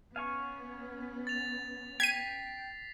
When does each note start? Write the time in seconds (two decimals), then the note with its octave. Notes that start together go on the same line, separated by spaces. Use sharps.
0.16 B3 C#4 F5 G#5 C#6
1.27 A6 F7
2.00 G5 G#6 B6 C7 D#7